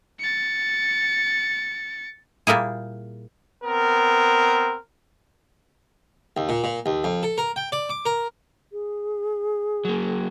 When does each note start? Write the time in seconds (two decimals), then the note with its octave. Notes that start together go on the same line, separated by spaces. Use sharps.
0.19 A6 C#7
2.47 A#2 G3 A#3 E4 G#4
3.63 B3 C4 A#4
6.37 D#2
6.49 A#2
6.64 A#2
6.86 D#2
7.04 F2
7.23 A4
7.38 A#4
7.56 G5
7.72 D5
7.90 D6
8.06 A#4
8.72 G#4
9.85 F#3 A#3